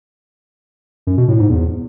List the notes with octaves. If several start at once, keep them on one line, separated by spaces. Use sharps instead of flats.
F#2
B2
A2
G#2
E2